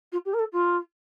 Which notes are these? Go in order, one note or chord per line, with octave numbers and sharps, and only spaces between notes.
F4
G4
A#4
A4
F4